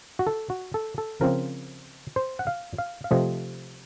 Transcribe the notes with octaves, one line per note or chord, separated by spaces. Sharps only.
F#4
A4
F#4
A4
A4
C#3 F3 C4 A#4
C5
F#5
F5
F5
F5
C3 F3 A3 C4 D#5